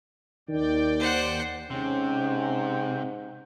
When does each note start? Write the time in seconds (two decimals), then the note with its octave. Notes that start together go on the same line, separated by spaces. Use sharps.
0.49 D#2 D#3 D5 G5
1.00 C5 F#5
1.71 G#2 C3 C#4 G5